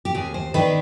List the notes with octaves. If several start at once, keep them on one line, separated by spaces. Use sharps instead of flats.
G4
D#2 G#4
C5
D#3 B3 D4 B4